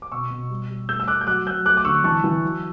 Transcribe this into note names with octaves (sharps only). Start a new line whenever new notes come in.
D6
B2 C#6 E6
B2
G3
G3
A3 E6 G6
E6
A3 D6 F#6
G6
F#3 D6 F#6
F#3 E6 G6
A3 D6 F#6
D6
D3 C#6 E6
E3 A5 C#6
E3
F#3